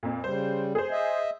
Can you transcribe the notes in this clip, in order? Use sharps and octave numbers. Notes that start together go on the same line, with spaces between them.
F2 A#2
C#3 G3 C5
G#4 C5
D#5 E5